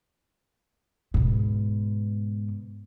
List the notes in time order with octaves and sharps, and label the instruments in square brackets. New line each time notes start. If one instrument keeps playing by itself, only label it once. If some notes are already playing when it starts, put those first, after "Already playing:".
[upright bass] G#2 B2